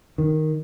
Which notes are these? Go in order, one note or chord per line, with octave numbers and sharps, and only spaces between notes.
D#3